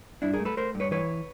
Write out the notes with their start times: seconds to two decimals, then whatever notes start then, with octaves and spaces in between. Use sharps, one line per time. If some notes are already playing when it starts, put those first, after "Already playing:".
0.22 G2 D4 E4
0.33 G#4 A#4
0.40 A3
0.45 A4 B4
0.57 A3 A#4 C5
0.75 G2
0.80 B4 C#5
0.91 E3 B4 C#5